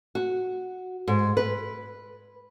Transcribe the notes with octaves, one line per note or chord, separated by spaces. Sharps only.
F#4
G#2
B4